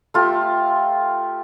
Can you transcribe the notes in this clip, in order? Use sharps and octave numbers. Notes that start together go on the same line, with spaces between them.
A3 F4 G4